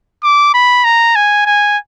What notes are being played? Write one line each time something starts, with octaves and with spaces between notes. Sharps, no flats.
D6
B5
A#5
G#5
G#5